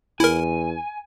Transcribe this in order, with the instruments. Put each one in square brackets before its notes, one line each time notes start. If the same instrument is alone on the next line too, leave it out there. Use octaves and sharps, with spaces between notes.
[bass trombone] E2 [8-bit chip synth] E4 A#4 [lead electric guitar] G#5